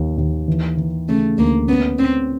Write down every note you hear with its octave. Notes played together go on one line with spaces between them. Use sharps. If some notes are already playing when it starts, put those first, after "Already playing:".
Already playing: D#2
D#2
E3
E3
C#3 A3
D2 A#3
B3 C#4
C4 C#4